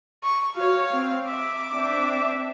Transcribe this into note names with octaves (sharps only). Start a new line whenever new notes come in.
C#6
F#4 C#5 F5
C4
E5 D6
C4 D4 E5